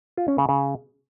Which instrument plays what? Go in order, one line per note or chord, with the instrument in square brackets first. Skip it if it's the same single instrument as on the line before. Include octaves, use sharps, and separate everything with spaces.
[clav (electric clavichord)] F4
C#4
C#3
C#3